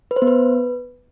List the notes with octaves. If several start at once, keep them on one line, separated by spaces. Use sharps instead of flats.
B4
C5
B3
B4